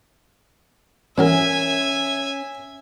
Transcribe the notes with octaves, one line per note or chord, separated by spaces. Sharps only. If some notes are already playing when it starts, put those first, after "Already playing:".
E2 F#3 C#4 A#4 E5 G#5